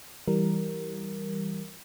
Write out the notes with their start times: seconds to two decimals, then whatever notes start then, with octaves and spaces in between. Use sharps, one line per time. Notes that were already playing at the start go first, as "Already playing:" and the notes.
0.28 E3 G3 A#4